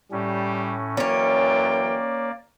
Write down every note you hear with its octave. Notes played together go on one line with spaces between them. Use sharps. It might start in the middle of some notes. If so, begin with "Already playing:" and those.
A2 G3 C#4
F#2 E3 A#3 C#4 C#5 D5 G5